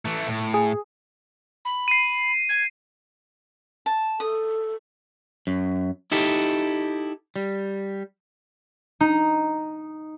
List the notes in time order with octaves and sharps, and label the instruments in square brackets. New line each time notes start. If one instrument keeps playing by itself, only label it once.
[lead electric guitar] E3 A3
A2
[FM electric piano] G#4
[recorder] B5
[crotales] C7 D#7
[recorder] G#6
[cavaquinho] A5
[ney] A4 [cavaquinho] D#6
[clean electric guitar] F#2
D#4 E4 G4 A4
G3
[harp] D#4